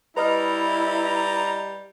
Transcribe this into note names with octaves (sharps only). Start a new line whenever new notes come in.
G3 E4 B4 D#5 A#5 F6